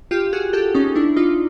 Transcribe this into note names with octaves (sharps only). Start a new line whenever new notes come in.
F4 G4
F#4 G#4
G4 A4
C#4 D#4
D4 E4
D#4 F4